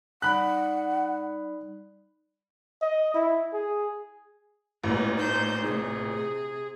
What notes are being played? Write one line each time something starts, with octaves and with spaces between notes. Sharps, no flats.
G3 D#4 D5 F#5 B5 F#6
D#5
E4
G#4
A1 A#2 G#3 B3
A3 D#4 C5 G6
C3 G#4